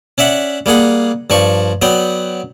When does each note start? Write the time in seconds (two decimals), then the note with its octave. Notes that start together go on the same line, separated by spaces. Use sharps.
0.18 C#4 D5 E5 F#5
0.66 G3 A#3 G#4 F#5
1.30 G2 F3 D5 C#6
1.82 F#3 B3 D5 G5